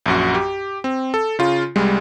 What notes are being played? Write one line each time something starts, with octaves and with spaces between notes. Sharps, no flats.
A#1 F#2 F#4
G4
C4
A4
C#3 F4
C2 G3 G#3